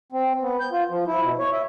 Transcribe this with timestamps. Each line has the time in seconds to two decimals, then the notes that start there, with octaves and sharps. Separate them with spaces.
0.12 C4
0.42 B3
0.60 G6
0.72 F4
0.89 F3
1.07 E4
1.22 B2
1.39 C#5
1.52 E5